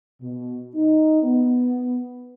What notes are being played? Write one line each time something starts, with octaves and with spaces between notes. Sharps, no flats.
B2
D#4
B3